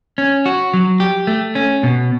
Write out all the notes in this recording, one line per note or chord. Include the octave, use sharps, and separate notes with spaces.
C#4
F#4
F#3
G4
A3
C#4
B2